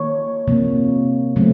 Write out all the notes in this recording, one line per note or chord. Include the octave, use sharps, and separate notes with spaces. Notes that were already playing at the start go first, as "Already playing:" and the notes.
Already playing: D#3 A#3 C#5
C3 F3 A#3
C#3 F#3 A3 C4